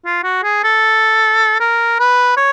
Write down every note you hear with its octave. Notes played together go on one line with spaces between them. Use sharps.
F4
F#4
G#4
A4
A#4
B4
C#5